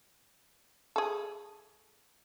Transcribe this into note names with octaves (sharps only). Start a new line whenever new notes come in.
G#4 A4